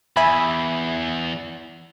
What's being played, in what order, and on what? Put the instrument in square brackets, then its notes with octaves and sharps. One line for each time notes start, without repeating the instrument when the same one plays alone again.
[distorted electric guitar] E2 [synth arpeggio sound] E5 G#5 B5